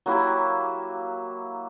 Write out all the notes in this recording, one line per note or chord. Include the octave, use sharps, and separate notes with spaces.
F#3 A#3 E4 G4